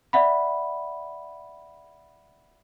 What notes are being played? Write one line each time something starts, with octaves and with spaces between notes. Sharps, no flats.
D5 E5 F#5 B5